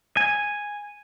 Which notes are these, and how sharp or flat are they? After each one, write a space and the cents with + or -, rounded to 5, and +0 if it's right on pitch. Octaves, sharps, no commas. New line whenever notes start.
G#5 -5